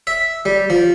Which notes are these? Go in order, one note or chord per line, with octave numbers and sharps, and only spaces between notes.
E5
G3
F3